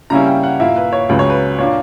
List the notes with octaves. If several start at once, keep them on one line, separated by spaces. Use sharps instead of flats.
C#3 G3 A#3 C#4 E4 A#5
G5
F#5
A#2 A#3 E4 E5
B4
C#5
C#2 C#3 F#3 B4
C#5
B4
A#2 A#3 D4 C#5